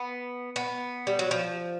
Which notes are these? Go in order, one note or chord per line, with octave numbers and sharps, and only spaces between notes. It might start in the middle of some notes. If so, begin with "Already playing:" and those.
Already playing: B3
B3
G3
F#3
F3